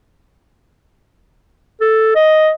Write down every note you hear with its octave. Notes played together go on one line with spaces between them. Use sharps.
A4
D#5